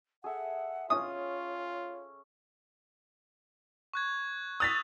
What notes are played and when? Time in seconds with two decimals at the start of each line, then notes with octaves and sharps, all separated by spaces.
0.24 G#4 A4 E5 F#5
0.90 C#4 F4 C#5 D#6
3.94 C#6 F#6 G#6
4.60 D#6 E6 F#6 A6 B6 F7